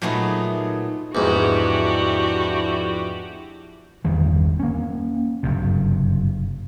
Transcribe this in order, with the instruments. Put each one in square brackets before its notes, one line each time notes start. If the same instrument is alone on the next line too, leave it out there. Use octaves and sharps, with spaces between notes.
[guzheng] A#2 F#3 A3 B3 D#4 G#4
[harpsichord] E2 G#2 [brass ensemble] F3 D4 E4 [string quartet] F#4 G4
[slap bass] G1 E2 D#3 G3
A#3 C#4
F#1 G2 C3